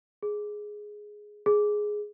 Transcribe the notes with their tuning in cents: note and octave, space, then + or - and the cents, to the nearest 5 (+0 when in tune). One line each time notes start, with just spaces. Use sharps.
G#4 +5
G#4 +5